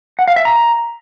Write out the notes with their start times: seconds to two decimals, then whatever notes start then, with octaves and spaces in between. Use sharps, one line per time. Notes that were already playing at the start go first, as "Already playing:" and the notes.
0.19 F#5
0.28 F5
0.36 E5
0.45 A#5